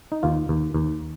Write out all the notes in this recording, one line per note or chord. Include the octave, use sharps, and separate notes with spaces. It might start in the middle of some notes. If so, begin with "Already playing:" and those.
D#4
D#2 F4
D#2
D#2